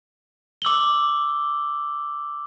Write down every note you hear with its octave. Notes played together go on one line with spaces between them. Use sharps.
D6 E6 F#7 G7